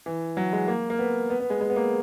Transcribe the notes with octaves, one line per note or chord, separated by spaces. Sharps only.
E3
F#3
G#3
A#3
A#3
B3
B3
B3
G#3
G#3
B3
A#3